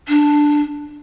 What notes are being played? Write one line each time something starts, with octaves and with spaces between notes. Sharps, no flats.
D4